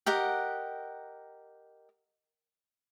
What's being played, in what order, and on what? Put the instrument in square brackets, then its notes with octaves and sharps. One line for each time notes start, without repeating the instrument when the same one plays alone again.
[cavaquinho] G4 A#4 D#5 F#5